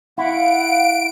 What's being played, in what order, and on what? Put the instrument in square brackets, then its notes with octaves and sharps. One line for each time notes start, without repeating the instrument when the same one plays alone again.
[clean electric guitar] E4 [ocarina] F5 [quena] F#5 [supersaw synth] D7